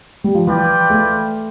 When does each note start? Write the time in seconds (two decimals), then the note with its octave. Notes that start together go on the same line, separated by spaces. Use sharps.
0.24 G3
0.35 F3
0.47 E3 F4 B4 D5 G5
0.90 A3